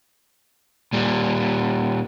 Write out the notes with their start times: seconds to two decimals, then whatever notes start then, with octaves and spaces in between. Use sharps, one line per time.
0.93 A#2 G3